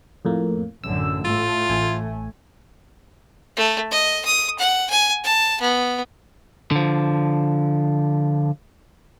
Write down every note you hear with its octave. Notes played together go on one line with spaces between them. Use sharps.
F2 A2 A#3
A1 F#2 D3 E6
A2 A3 F4
A1 G#5
A3
D#5
D#6
F#5
G#5
A5
B3
D3 F3